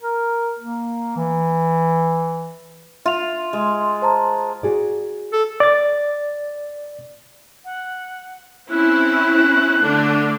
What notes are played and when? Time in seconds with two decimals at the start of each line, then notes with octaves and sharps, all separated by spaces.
0.02 A#4
0.59 A#3
1.17 E3
3.06 F4 E5 F7
3.53 G#3
4.02 C5 A5 A#5
4.63 F#4 G#4 D5
5.33 A4
5.60 D5 A6
7.65 F#5
8.70 C4 C#4 E4 F#6
9.83 D3 A3 D4